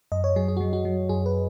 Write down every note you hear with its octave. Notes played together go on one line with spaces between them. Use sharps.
F#2 D#5
C#5
F#3 G#4
G#4
F#4
F#3
F#4
F#3
F#2 G#4
B4